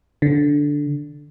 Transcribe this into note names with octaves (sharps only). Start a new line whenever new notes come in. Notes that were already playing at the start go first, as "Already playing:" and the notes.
D3